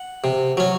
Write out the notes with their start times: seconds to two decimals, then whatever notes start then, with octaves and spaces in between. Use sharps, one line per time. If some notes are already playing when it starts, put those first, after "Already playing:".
Already playing: F#5
0.24 C3
0.57 F#3 C#4